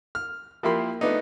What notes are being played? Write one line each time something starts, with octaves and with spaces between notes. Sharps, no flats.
F6
F3 A#3 E4 G4 B5 C6
A3 B3 D4 D#4